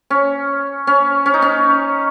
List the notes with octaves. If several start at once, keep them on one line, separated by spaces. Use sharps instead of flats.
C#4
C#4
C#4
D#4
C#4